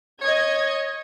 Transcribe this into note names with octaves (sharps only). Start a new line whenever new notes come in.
C#5 D#5 G#6